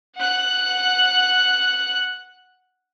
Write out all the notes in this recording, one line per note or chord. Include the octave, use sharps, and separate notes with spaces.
F#5 F#6